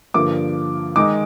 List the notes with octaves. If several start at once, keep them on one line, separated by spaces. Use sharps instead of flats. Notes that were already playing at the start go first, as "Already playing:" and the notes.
G2 D3 F3 A#3 D6
D#3 G#3 D#4 D6